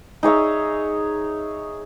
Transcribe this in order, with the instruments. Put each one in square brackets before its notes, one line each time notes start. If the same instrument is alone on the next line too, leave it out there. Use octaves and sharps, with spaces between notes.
[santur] D#4 G#4 C#5 E5